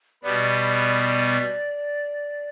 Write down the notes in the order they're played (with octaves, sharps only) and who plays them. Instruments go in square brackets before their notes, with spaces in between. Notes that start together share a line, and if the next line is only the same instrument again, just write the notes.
[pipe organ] B2 G3 B3 [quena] D5